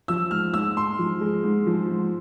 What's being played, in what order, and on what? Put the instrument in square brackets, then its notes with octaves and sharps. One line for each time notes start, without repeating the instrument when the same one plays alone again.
[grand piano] F3 E6
G#2 F6
G#2 E6
G#2 C6
F3
G#3
G#2
F3
G#2